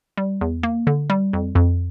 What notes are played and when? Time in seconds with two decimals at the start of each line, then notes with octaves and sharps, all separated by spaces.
0.17 G3
0.41 E2
0.63 A#3
0.87 D3
1.10 G3
1.33 F2
1.55 F2